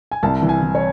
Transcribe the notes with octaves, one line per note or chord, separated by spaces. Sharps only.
G#5
C2 A5
E3
G#5
E3
C#5